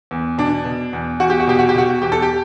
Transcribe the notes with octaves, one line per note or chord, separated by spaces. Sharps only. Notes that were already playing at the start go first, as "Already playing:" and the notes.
E2
B2 D4
B2
E2
E2 F#4
G4
F#4
B2 G4
F#4
G4
B2 F#4
E2 G4
A4
G4